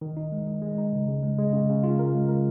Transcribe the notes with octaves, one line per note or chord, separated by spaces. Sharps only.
D#3
D#4
G#3
D#4
G#3
D#4
C#3
C#3
G#3
G#3
C#3
C#3
F4
A#4
G#3
A#4